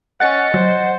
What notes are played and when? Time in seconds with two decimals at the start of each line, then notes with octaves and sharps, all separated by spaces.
0.20 C#4 D#5 F#5 A6 C#7
0.54 F#3 C5